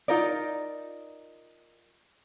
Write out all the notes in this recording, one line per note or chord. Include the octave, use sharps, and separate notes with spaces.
D#4 F4 A#4 D5